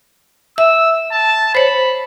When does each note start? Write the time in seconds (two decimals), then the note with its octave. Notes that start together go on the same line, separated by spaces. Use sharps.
0.58 E5 E6
1.12 A5
1.55 C5 C#5 B5